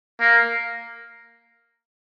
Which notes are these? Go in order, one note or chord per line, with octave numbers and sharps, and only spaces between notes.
A#3